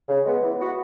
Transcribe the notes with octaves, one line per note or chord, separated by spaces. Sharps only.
C#3
G#3 B3
E3
B3 F#4